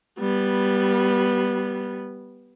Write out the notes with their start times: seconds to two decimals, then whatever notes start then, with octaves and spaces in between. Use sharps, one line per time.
0.19 G3 B3